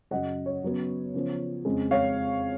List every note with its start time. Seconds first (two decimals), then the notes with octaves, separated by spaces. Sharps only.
0.11 F#2 C#3 F#3 D#5 F#5
0.46 C#5
0.63 C#3 F#3 B3
1.14 C#3 F3 B3
1.65 F2 C#3 G#3
1.91 C#5 F5